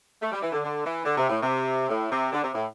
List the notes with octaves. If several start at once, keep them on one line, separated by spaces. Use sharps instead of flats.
A3
G3
E3
D3
D3
E3
D3
C3
A2
C3
A2
C3
D3
C3
A2